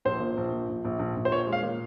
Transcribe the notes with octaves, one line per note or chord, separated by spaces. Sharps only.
A#1 C5
A#2
A#1
A#2
A#1
A#1
A#1
A#1
C5
A#2 C#5
G#3
F5
A#2